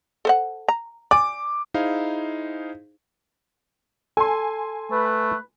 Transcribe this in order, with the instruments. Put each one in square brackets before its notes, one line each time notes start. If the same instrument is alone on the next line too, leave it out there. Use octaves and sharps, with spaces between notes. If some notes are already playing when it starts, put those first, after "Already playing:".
[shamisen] A4 C5 F#5
A#5
[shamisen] D5 G#5 [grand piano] D6
[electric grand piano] D#4 E4 G#4 C5 F5
[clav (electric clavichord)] A4 [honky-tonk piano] G#5 C6
[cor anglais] A3 [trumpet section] B4